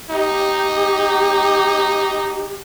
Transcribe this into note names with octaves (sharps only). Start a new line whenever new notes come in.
D#4 G4